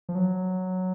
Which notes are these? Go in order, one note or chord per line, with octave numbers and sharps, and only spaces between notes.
F3
F#3